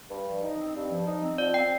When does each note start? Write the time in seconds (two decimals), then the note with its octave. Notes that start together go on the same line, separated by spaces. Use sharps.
0.10 G2
0.25 F3
0.42 D#4
0.58 C4
0.75 G2
0.90 F3
1.06 D#4
1.22 C4
1.38 F3 D5
1.54 C4 G5